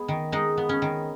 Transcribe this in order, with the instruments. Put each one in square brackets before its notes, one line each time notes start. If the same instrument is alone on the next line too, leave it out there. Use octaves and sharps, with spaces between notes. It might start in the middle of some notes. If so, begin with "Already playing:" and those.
Already playing: [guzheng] G#3 B3 G#4
D#3
G#3 D#4
B3
C#4
D#3